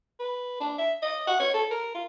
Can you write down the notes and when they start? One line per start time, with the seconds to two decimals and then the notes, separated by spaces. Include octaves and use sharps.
0.19 B4
0.60 D4
0.78 E5
1.02 D#5
1.27 F#5
1.40 C#5
1.54 A4
1.71 A#4
1.95 F4